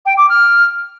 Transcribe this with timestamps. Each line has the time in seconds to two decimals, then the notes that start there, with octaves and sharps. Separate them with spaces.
0.06 G5
0.17 D6
0.29 F6